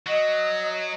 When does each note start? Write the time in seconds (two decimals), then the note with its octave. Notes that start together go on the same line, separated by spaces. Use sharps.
0.07 F#3 D#5 D#6